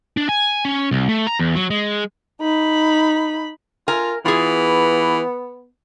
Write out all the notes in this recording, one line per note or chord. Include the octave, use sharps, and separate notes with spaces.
D4
G#5
C#4
C2
A3
A#5
E2
F#3
G#3
D#4 B5
F4 A#4 G#5
E3 B3 F4 G#4